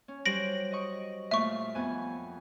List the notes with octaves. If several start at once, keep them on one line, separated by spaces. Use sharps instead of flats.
C#4
F#3 G3 C5 A#6 D7 F#7
D#5 C#6
A#2 A3 E5 F5 C#6
F2 B3 G#5